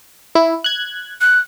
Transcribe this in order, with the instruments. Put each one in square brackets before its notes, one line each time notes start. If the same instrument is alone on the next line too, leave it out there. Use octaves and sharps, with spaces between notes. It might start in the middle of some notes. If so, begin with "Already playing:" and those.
[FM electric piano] E4
F#6 G#6
[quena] F#6